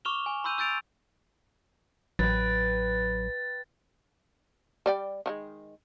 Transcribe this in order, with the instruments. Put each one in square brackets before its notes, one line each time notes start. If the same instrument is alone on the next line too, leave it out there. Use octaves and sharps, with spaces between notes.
[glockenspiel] C#6 D6 F6 E7 F7 G7
G#5
B5 C6 E6 G6 D#7
E6 G6 A6 D7 F7
[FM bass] A1 [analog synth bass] F#3 [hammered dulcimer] B4 G5 [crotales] A6
[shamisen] G3 D5 G5
D#3 F#3 G#3